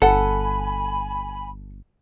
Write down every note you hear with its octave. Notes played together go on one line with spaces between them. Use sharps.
G1 A4 F#5 G#5 B5